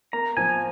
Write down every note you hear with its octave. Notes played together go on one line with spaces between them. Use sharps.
A#3 A#5
F3 G#5